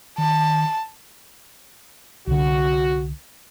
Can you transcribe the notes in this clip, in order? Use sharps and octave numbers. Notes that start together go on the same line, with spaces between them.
D#3 A5
C2 D3 F#4